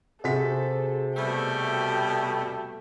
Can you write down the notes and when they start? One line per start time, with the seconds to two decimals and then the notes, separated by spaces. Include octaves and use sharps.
0.24 C3 F#4 G#4 A4 C5 B6
1.17 B2 G3 A3 G5